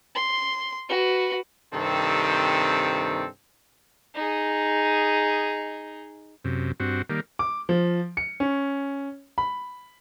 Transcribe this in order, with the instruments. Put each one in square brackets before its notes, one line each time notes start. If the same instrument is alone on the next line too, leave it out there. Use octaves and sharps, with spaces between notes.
[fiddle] C6
F#4 B4
[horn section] G2 C3 D#3 C4 A4
[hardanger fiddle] D#4 G#4
[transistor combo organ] F#2 C3
G2 C4 F#4
D#3 G3 A#3
[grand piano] D6
F3
C#7
C#4
B5